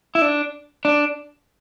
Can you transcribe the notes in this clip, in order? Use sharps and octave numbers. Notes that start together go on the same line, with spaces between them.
E4
D4
D4